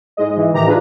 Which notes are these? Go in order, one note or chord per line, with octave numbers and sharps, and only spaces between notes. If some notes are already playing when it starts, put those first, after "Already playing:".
G#2 G#3 D#5
E3
A1 D#3 E3 G4 A#5
D4 F4 G#4 B4